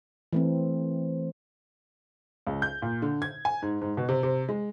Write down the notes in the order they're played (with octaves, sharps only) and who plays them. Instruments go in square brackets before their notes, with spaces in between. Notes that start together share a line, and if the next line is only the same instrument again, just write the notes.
[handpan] E3 A3 C4
[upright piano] C#2
G6
A#2
D3
G#6
G#5
G#2
G#2
B2
C3
C3
G#3